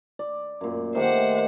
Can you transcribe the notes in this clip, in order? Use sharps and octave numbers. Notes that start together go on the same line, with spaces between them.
D5
F#2 A#2
D#3 A3 G4 C5 F#5